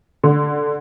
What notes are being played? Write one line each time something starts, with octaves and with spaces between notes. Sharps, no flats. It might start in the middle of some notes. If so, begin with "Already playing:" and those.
D3